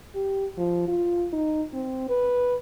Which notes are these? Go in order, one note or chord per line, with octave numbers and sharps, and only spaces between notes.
G4
F3
F4
D#4
C4
B4